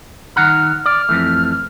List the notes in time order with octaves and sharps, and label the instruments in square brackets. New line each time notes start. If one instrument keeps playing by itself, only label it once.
[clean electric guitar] D#3 F#5 A#5 [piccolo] F6
[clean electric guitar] D5 [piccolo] F6
[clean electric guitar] F2 E3 A3